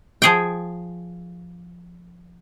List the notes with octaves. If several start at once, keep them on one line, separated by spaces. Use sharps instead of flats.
F3 G#4 G5